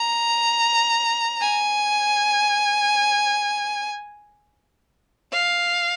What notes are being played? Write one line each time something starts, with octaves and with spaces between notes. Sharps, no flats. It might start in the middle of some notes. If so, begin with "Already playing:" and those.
Already playing: A#5
G#5
F5